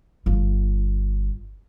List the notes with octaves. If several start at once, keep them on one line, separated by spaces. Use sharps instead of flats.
G1 F4